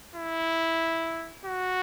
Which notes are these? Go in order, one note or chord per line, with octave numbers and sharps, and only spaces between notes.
E4
F#4